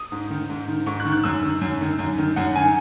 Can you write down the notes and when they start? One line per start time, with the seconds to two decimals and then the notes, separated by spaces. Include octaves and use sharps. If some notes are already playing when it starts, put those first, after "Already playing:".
Already playing: D#6
0.12 G#2
0.30 D#3
0.50 G#2
0.68 D#3
0.86 G#2 C#6
1.00 F#6
1.05 D#3
1.12 F#6
1.24 F#2 E6
1.42 D#3
1.61 F#2
1.81 D#3
1.99 F#2
2.18 D#3
2.36 F#2 F#5
2.55 D#3 G#5